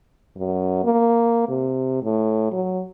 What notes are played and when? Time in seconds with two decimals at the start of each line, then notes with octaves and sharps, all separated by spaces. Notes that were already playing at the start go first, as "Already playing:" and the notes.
0.37 F#2
0.84 A#3
1.49 C3
2.03 A2
2.52 F#3